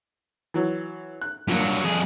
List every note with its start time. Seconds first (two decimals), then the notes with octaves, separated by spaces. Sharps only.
0.54 E3 F#3
1.22 F#6
1.48 G2 F3 F#3 A#3
1.85 F2 G#4